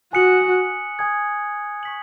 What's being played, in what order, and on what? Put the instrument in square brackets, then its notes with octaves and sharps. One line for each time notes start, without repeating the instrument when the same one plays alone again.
[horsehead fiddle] F#4 [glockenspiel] G#5 D#6 F#6 C#7 F#7
[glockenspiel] G#5 D#6 G#6
C#6 B6 F#7